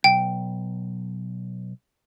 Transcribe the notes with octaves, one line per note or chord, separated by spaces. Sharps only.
B1 G5